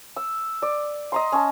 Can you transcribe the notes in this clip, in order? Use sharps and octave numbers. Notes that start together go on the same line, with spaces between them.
E6
D5
D#5 A#5 C6
C#4 A5